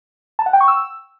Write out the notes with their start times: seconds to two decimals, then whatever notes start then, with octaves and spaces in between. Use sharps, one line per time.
0.39 A5
0.46 F#5
0.53 G5
0.61 C#6
0.68 E6